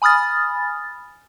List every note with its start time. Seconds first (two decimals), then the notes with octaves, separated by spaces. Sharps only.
0.02 G#5 B5 D#6 F6 A6